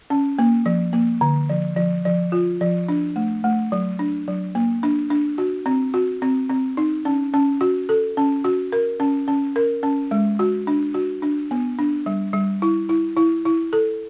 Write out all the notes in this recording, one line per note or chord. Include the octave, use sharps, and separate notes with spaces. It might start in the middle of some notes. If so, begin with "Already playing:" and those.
C#4
A#3
F3
A#3
D3
F3
F3
F3
F4
F3
D4
A3
A3
F#3
D4
F#3
A#3
D4
D4
F#4
C4
F#4
C4
C4
D#4
C#4
C#4
F#4
A4
C#4
F#4
A#4
C#4
C#4
A#4
C#4
G#3
F#4
D4
F#4
D4
B3
D4
G3
G3
E4
E4
E4
E4
A4